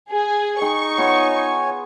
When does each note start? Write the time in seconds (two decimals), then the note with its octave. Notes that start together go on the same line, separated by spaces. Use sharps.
0.11 G#4 G#5
0.61 D#4 G#4 G5 C#6
0.98 B3 F4 C#5 G#5